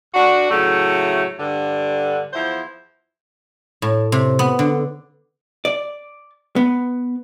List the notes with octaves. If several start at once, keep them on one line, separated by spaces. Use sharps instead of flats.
D2 D4 F#4
A2 C#3 F#3 A3
G2 D3
E2 F3 E4 C5
A2
C3
B3
D3
D5
B3